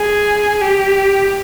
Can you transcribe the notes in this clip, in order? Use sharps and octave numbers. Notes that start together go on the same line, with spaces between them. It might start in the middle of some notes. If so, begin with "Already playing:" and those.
Already playing: G#4
G4